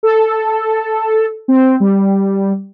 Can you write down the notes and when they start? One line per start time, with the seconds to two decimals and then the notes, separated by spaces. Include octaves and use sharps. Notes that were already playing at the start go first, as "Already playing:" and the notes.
0.03 A4
1.48 C4
1.80 G3